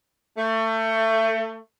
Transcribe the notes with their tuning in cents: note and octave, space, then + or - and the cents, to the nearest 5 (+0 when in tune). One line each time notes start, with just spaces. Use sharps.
A3 +25